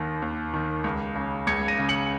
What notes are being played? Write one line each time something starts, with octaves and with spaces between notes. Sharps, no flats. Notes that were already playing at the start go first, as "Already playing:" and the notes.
Already playing: D#2 D#3 A#6
D#2
D#3
C#2
C#3
C#2 G#6 C#7
A#6 D#7
C#3
C#7 F#7